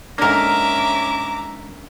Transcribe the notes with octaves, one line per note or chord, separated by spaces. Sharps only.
G#2 A#3 C#4 D4 A#4 E5 A#5 D6